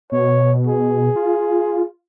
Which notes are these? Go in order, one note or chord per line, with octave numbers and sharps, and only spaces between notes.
B2 C#5
G#4
F4